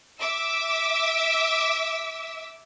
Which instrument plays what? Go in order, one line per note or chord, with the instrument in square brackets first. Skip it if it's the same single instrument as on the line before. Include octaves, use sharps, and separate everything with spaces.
[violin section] E5 D6 E6